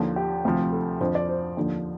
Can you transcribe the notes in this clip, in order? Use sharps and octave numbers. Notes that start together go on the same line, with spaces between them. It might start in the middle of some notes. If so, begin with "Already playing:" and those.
Already playing: D#2 D3 F3
G4
D2 C3 F3
A4
F2 D3 F3 C5
D5
C5
D#2 D3 F3